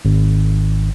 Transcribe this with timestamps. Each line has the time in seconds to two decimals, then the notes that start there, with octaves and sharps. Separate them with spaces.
0.05 G#1